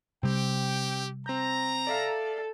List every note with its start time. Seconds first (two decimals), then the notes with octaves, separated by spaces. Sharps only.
0.23 C3 G3 C4 G4 G5
1.26 C4 A#5 G6
1.87 A4 D5 E5 F5